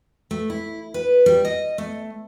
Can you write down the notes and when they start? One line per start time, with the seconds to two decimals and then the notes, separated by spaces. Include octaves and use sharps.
0.31 A3
0.50 E4
0.94 B4
1.26 G3
1.45 D#5
1.78 A3